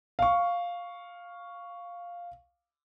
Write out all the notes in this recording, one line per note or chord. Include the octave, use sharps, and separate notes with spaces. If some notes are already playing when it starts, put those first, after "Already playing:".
F5 C#6